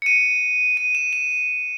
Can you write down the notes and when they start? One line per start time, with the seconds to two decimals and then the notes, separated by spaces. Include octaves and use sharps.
0.02 C#7
0.06 D#7
0.77 D#7
0.95 E7
1.13 E7